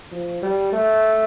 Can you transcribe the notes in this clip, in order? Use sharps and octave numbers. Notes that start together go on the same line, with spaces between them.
F3
G3
A3